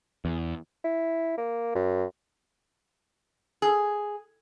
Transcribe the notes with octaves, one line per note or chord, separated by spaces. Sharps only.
E2
E4
A#3
F#2
G#4